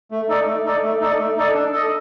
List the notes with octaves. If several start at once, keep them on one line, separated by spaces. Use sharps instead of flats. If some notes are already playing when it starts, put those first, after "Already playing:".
A3
D#4 A4 D5
A3
D#4 A4 D5
A3
D#4 A4 D5
A3
D#4 A4 D5
D4
A4 D#5